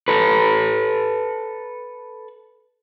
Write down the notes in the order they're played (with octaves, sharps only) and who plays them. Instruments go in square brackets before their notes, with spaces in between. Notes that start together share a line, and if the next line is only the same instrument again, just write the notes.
[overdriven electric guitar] A4 B4